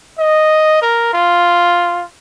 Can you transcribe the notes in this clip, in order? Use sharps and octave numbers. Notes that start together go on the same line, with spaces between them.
D#5
A#4
F4